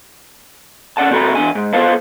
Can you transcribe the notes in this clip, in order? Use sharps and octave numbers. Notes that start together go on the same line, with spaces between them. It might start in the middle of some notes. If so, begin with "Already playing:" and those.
C#4 D5 F#5 A5
C3 C4 F#4 A4 A#5 B5
E2 D4 G#5
G#2
B3 F4 A4 C5 F5 A5